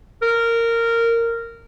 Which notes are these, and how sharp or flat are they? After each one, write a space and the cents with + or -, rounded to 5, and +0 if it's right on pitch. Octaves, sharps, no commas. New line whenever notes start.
A#4 -15